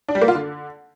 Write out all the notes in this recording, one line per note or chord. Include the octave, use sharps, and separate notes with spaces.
D4
G3
A#3
F4
D3